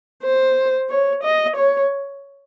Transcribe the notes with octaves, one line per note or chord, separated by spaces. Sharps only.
C5
C#5
D#5
C#5